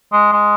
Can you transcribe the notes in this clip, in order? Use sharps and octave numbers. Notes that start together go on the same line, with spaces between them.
G#3
G#3